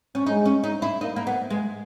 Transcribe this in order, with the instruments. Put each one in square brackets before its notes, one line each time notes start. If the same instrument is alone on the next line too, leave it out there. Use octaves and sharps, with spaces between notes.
[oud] C#4
[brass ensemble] G#3 [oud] D#4
[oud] C#4
D#4
E4
[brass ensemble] A#3 [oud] D#4
[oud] A#3
B3
G#3